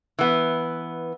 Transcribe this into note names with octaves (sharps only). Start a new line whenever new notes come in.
E3 B3